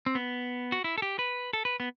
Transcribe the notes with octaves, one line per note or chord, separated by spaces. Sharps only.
C4
B3
F#4
E4
A4
G4
B4
A4
B4
B3